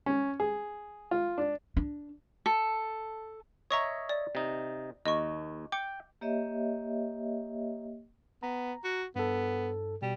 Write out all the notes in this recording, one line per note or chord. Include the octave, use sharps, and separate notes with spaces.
C#4
G#4
F4
D4
D4
A4
C#5 D#5 E5 A#5 C#6 D#6
D5
C3 D#4
D#2 D#5 C#6
G5 D6 C#7
A#3 G4 C#5 D#5 E5
B3 A#5
F#4
G2 B3 A4
B2 G3